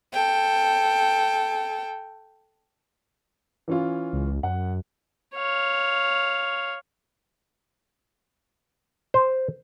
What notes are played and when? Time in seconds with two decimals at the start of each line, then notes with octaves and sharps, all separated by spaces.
0.13 A4 G5
3.68 E3 C#4 F4
4.13 C#2
4.43 F#2 F#5
5.35 C#5 F5
9.14 C5